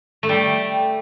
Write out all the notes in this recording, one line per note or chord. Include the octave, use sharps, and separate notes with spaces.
A3
G3